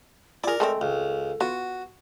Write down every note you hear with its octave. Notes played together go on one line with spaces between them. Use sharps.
E4 F4 G#4 A#4 D5
G#3 A3 C4 A4
C#2
B3 F4 F#4